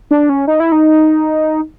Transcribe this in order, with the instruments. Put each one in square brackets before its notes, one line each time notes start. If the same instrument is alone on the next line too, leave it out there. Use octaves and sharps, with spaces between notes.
[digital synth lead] D4
C#4
D#4
E4
D#4